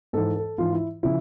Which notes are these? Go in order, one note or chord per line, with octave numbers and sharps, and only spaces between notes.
G#2 E3 A4
A4
G#2 E3 F4
E4
C#3 F3 E4